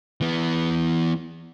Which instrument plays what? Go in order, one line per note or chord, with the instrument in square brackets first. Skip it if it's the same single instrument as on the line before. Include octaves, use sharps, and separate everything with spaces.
[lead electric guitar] E3 B3